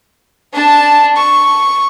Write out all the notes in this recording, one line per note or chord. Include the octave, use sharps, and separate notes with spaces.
D4 A5
C#6